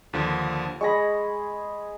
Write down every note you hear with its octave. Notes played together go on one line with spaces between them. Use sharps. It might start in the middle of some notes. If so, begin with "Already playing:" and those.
D#2 D3 F3
G#3 G#4 B5 C#6 A#6